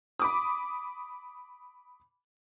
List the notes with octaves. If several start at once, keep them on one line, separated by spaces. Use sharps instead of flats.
B5 D6 D#6